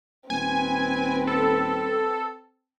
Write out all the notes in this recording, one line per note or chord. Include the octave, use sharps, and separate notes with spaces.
D#1 C4 B4 G#5
A4